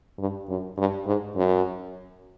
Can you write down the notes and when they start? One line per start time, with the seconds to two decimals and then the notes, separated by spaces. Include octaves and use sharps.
0.19 G2
0.49 F#2
0.77 G2
1.06 G#2
1.36 F#2